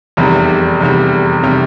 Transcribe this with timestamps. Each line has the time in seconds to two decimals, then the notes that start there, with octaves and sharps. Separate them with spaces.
0.17 F1 E2 C3 G3
0.80 F1 E2 C3 G3
1.43 C3 G3